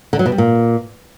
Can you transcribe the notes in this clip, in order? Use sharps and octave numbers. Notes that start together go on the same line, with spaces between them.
D3
F#3
B2
G3
A#2